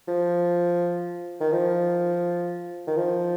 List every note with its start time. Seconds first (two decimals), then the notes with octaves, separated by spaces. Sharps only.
0.08 F3
1.40 D#3
1.52 F3
2.87 D#3
2.97 F3